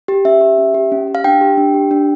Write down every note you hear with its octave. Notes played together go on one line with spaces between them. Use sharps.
G4
C#4 E5
G4
C#4
G4
C#4
G4
F5
D4 G5
G4
D4
G4
D4